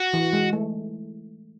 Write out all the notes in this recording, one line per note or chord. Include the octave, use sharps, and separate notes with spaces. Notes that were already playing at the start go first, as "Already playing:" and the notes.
Already playing: F#4
E3
G#3
A3